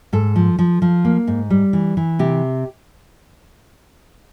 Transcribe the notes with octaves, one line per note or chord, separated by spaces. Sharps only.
G#2 A4
F3
F3
F3
A#3
G#2
G3
E3
E3
C3 G4